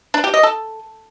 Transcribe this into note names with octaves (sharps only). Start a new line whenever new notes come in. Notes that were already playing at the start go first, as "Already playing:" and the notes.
D4
G4
D#5
A4